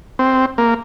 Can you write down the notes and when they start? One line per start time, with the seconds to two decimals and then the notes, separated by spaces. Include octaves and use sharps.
0.19 C4
0.58 A#3